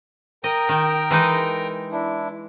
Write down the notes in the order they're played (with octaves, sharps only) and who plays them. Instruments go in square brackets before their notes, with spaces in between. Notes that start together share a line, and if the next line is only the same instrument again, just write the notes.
[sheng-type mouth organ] A#4 G5 A#5 [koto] D#5
[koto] D#3
E3 G#3 D#4
[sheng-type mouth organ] D4 E4